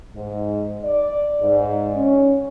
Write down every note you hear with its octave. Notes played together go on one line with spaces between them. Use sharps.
G#2
D5
G#2
C#4